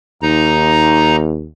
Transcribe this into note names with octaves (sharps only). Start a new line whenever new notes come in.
D#2 D#4 A#5